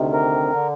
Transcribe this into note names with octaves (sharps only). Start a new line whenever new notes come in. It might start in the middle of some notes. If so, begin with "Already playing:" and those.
Already playing: D2 C3 D#3
A#4
D3